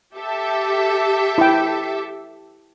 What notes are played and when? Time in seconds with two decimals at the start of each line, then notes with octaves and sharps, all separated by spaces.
0.16 G4 A4 E5
1.38 E4 G5